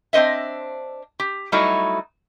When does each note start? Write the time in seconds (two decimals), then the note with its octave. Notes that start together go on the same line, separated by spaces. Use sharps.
0.13 C4 D4 C5 D#5 E5
1.20 G4
1.52 F#3 G3 A3 D#4 E4 F#4